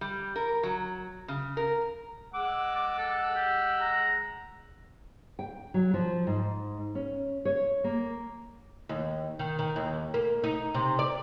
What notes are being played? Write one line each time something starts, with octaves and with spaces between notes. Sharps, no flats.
G3
A#4
F#3
C#3
A#4
G#3 F#5 D6 E6
D6
A4
G4
A#5
G5
F#3
F3
G#2
C#4
C#5
A#3
D#2
D#3
D#3
D#2
A#3
D#4
C3
D5